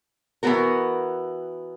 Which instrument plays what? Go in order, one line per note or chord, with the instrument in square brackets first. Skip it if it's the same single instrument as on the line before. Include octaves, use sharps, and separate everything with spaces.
[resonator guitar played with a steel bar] E3 B3 F#4 A#4